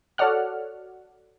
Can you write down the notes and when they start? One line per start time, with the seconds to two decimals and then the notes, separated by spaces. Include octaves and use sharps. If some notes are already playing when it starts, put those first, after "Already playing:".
0.18 F#4 A4 C#5 D5 F#5 F6